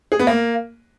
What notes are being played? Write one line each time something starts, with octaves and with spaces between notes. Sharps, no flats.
G#4
B3
A#3